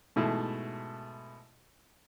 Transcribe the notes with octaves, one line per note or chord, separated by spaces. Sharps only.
G#2 B2 A3 E4 A5